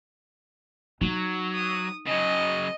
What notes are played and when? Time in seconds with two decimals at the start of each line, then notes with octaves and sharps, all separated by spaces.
1.01 F#3 D#4
1.54 D#6
2.07 C#3 F#3 D#5